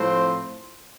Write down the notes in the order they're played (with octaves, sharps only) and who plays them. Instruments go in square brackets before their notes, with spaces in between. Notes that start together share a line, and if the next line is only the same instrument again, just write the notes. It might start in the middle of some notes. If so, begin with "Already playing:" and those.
Already playing: [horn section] A2 F3 C4 C5